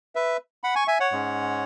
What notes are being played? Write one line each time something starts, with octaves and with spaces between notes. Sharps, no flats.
B4 E5
F#5 B5
G#5 C#6
E5 G#5
C#5 F#5
G#2 G#3 C#4